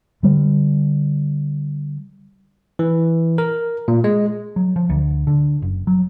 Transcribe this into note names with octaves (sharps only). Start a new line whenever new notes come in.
D3 G3
E3
A#4
A#2
G#3
F#3
F3
D2
D3
F#1
F#3